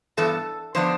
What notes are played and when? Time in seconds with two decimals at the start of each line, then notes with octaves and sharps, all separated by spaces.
0.17 G2 E3 B3 A4
0.75 D3 F3 B3 D4 C5